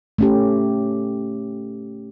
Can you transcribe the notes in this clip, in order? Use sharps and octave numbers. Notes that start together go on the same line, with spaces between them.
A3 C#4 G4